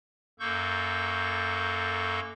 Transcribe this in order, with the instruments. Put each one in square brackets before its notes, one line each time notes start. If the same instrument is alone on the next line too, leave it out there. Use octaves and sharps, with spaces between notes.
[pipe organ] F#2 A#3 A4 C#6 G6